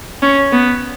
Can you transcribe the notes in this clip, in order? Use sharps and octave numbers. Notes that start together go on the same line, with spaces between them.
C#4
B3